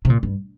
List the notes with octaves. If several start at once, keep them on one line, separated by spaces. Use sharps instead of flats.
C3
A#2
G2